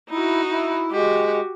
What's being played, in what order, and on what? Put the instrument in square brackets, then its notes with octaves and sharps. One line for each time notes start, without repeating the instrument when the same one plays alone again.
[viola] D#4 F#4 [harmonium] E4
[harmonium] E4
[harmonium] G#3 [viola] F#4 G4